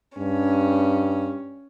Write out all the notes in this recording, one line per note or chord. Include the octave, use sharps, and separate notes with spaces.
G2 C#4